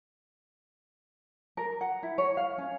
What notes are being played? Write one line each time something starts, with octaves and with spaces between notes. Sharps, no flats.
A#4
F#5
E4
C#5
F5
C#4